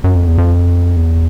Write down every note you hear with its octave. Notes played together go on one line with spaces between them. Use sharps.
F#2
F2
E2
F2
E2